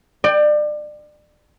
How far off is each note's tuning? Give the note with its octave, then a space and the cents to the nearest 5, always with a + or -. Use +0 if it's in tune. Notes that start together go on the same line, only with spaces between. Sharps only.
D5 +30 G5 +0